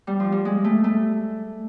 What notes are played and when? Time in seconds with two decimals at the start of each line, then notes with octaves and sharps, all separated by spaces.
0.07 G3
0.20 F3
0.32 G3
0.45 G#3
0.64 A3
0.84 A3